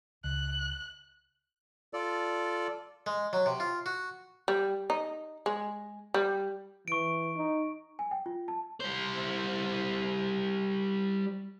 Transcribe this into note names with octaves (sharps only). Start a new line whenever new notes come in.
C#2 F#6
F4 A4 D5
G#3
F#3
C3
F4
F#4
G3
D#4
G#3
G3
E3 C#6 D7
D#4
G#5
G5
F4
A5
G3 C5